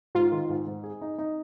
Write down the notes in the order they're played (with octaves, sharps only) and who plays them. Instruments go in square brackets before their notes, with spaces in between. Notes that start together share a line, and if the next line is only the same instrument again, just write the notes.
[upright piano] G#2 [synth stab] F4
[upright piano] D#3
G#2
G#2
G#4
D#4
D#4